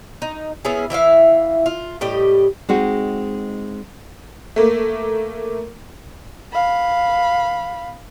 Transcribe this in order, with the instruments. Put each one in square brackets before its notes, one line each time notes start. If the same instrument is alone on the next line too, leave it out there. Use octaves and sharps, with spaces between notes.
[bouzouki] D#4
B3 C#4 E4 G#4
E3 E4 E5 F5
F4
A2 G3 G4 D#5
[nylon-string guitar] G#3 C4 D#4 F#4
[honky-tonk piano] A3 A#3
[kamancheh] F5 B5